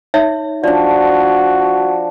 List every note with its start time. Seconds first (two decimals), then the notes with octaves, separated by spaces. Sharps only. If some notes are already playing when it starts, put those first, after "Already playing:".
0.14 D#4 C#5 E5
0.64 F3 D4 F#4 D5